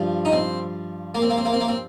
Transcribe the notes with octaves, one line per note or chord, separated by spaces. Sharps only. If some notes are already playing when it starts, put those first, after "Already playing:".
Already playing: G2 F3
D#4
C4
A#3
C4
A#3
C4
A#3
C4
A#3
C4